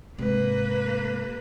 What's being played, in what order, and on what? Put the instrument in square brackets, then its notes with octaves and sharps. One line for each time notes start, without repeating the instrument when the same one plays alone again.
[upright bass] G#2 C3 [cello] A#3 B4